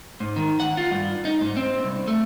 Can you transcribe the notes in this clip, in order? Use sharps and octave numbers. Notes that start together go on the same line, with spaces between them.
G#2
D#3
F#5
F4
G2
D#4
G#2
C4
C2
A3